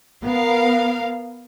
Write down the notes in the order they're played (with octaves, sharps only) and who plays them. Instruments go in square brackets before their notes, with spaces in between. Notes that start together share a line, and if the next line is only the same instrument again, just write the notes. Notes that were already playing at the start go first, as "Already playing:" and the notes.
[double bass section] B3 [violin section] A#4 F5